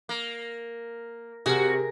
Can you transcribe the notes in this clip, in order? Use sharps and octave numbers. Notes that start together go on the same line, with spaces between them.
A#3
C3 F#4 G#4 A#4